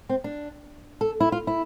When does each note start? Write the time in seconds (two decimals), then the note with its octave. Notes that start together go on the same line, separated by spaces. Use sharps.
0.09 C4
0.24 D4
1.01 A4
1.20 E4
1.32 F4
1.47 E4